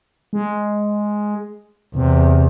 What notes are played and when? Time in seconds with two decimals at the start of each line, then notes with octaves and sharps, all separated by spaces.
0.33 G#3
1.95 E2 C3